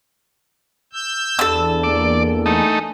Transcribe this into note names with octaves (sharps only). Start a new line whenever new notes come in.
E6 G6
E2 D4 A4 B4 E6
A#2 A#3 D5 D6
A3 D#4 F#5 G#5 B5